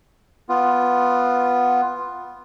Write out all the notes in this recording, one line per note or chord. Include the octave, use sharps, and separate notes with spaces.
B3 F4